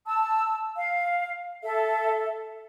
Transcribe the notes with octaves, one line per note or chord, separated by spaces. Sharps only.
A5 E6
F5
A4 E5